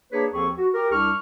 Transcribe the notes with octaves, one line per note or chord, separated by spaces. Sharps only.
A#3 D4 G#4 B4 C#5
D#2 F3 C4 G#4 A4 C#6
F#4
G4 A#4
C2 D4 C#6 F6